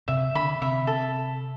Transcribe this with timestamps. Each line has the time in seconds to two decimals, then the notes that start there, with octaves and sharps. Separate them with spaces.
0.08 C3 C4 E5
0.35 D3 D4 B5
0.61 C3 C4 E5
0.87 A4